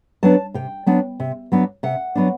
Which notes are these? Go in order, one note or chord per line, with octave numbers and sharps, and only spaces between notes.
F#3 B3 D4 A5
C3 G5
F#3 B3 D4
C3
F#3 B3 D4
C3 F#5
F#3 B3 D4